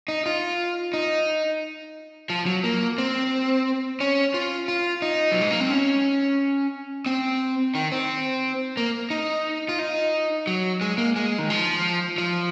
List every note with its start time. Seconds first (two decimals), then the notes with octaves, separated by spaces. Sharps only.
0.08 D#4
0.26 F4
0.94 D#4
2.30 F3
2.46 F#3
2.64 A#3
2.98 C4
4.00 C#4
4.34 F4
4.68 F4
5.02 D#4
5.32 F#3
5.41 G#3
5.51 A#3
5.61 C4
5.70 C#4
7.06 C4
7.75 D#3
7.92 C4
8.77 A#3
9.10 D#4
9.69 F4
9.79 D#4
10.47 F#3
10.81 G#3
10.98 A#3
11.16 G#3
11.38 D#3
11.50 F3
12.18 F3